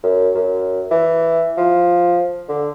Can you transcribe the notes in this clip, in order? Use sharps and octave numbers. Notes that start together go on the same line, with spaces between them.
F#2
F#2
E3
F3
D3